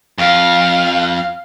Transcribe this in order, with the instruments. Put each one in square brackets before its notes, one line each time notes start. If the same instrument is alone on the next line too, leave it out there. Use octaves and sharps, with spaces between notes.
[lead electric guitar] F2 [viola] F5